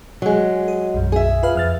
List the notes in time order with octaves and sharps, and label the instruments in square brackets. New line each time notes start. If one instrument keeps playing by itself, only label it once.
[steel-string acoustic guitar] F#3 G#3
[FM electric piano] G#4
B1 F#2
[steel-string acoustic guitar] G#4 E5
[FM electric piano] F4 B4 F5
F2 F6 A6